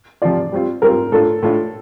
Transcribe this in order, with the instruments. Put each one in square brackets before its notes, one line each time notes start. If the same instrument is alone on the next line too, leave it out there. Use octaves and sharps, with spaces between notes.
[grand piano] C3 F3 C4 F4 [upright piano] D5
[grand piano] G3 C4 F4
[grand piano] G3 C4 F4 [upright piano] A#4
[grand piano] A2 A3 D4 F4 [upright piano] A4
[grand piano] A2 A3 D4 F4